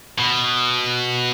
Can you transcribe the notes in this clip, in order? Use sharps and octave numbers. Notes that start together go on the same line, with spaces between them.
B2